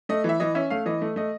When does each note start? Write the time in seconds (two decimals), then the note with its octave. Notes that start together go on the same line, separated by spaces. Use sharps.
0.09 A3 D#5
0.24 E3 E5
0.40 E3 D#5
0.55 C#4 E5
0.70 A3 F5
0.86 E3 D#5
1.02 A3
1.16 A3 D#5